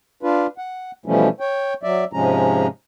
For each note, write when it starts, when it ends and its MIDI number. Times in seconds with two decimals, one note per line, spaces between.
0.23 0.47 62
0.23 0.47 65
0.23 0.47 71
0.58 0.91 78
1.06 1.28 47
1.06 1.28 52
1.06 1.28 53
1.06 1.28 55
1.06 1.28 57
1.06 1.28 61
1.40 1.74 73
1.40 1.74 79
1.83 2.04 54
1.83 2.04 74
1.83 2.04 76
2.13 2.67 44
2.13 2.67 48
2.13 2.67 53
2.13 2.67 56
2.13 2.67 61
2.13 2.67 82